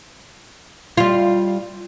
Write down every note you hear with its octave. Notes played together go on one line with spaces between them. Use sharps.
G3 F4